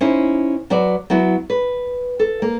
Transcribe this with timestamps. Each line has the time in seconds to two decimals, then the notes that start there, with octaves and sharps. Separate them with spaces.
0.01 C#4 D#4 E4 C5
0.70 F#3 F#4 B4 D5
1.10 F#3 B3 E4 F#4
1.50 B4
2.19 A4
2.42 A#3